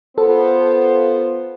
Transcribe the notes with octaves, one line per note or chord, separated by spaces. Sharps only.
B3 F4 A4 C5